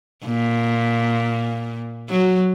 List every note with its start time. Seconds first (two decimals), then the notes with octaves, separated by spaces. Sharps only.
0.25 A#2
2.10 F#3